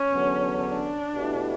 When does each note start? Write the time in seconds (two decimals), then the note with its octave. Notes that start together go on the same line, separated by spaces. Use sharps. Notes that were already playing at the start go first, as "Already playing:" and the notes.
Already playing: C#4
0.11 E2 D3 F#3 B3
0.61 D4
1.14 B2 A3 E4 G4